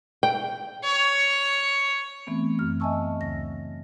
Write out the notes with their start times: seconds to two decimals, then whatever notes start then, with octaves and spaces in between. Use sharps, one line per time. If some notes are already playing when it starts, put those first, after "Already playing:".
0.23 G5
0.84 C#5
2.27 E3 A3 B3 C4
2.59 F#2 F6
2.80 D#5 E5 G#5 A5 C#6 E6
3.20 D2 C#3 A#6